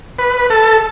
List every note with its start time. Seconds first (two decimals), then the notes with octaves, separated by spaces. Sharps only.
0.19 B4
0.50 A4